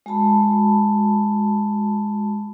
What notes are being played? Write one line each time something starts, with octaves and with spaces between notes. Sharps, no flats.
G#3 F#4 A5 B5